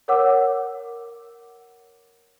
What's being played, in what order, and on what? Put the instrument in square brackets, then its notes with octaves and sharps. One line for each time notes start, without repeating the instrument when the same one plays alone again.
[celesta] A#4 C#5 F#5 D6 E6